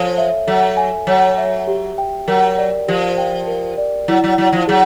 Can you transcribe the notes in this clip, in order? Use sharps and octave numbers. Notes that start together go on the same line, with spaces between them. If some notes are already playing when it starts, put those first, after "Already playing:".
Already playing: F3 A4 C#5 G#5
E5
F#3 A4
G#5
F#3 C#5
E5
G4
G5
F#3 A#4
D5
F3 G4
G5
A#4
D5
F#3 E4
F#3
F#3 E4
F3
F#3 G#4